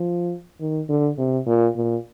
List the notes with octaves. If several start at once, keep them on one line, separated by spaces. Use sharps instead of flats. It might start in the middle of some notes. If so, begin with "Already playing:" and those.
Already playing: F3
D#3
D3
C3
A#2
A#2